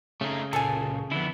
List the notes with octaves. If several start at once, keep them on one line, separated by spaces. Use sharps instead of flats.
C#3 A3 D#4
C#2 A#2 A4 G#5
F2 D3 B3 E4